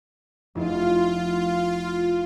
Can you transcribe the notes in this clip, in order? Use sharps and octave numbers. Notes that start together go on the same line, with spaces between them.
F1 E4 F4